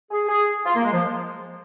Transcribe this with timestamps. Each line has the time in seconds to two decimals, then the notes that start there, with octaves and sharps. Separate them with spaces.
0.11 G#4
0.29 G#4
0.66 F4
0.75 A#3
0.84 G#3
0.93 F3